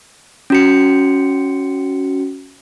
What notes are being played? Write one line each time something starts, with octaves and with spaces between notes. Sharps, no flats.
C#4 F#4 C#7